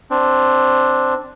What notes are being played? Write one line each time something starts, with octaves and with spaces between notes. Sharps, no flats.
C4 D4